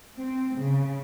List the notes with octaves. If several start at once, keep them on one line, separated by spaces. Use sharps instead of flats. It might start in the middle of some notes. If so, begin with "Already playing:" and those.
C4
C#3